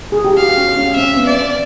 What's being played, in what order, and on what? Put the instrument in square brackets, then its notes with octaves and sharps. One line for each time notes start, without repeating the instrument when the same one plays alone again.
[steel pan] G#4
G4
[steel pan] F#4 [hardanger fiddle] F5
[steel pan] C#4
C#4
[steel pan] C4 [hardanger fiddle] E5
[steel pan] B3
[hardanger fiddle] D5